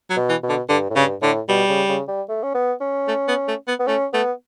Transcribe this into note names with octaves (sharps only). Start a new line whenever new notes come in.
F#3
B2
E3
B2
D3
G2 D3
A2
G2 C#3
A2 D3
B2 G3
C#3
C#3
G3
A3
C#4
B3
C#4
A3
B3
A3
B3
B3
A3 C#4
A3 B3